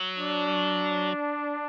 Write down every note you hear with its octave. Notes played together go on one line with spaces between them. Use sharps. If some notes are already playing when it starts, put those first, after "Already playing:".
Already playing: F#3
D4